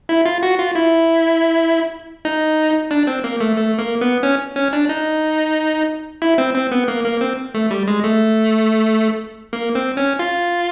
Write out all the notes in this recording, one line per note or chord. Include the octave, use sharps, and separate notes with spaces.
E4
F4
F#4
F4
E4
D#4
D4
C4
A#3
A3
A3
A#3
B3
C#4
C#4
D4
D#4
E4
C4
C4
B3
A#3
A#3
C4
A3
G3
G#3
A3
A#3
C4
C#4
F4